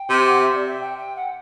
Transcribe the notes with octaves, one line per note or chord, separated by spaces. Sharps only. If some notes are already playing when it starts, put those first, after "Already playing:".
Already playing: G5
C3
F#5
E5
D5
E5
G5
G5
F#5